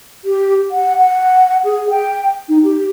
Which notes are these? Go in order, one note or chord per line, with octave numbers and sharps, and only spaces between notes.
G4
F#5
F#5
G#4
G5
D#4
G4